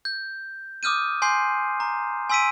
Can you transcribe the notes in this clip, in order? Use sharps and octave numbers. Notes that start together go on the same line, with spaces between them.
G6
D6 D#6 F6 G6 D#7
G#5 C6 G6 C7
A#5
G#5 C6 E6 B6 D7 D#7